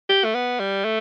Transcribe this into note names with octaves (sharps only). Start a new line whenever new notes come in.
G4
A3
B3
G3
A3